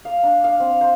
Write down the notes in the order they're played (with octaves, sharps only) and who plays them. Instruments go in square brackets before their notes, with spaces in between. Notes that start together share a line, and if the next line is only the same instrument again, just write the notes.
[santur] F5
D4
F5
C4
C5